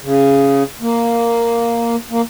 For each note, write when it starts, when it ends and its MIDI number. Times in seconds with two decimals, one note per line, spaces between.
0.02 0.63 49
0.81 1.96 58
2.11 2.21 58